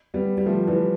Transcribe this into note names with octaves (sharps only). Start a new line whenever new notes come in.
G3 B3
G3
F3 A3
E3 G3